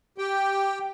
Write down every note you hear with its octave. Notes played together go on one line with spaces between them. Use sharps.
G4 G5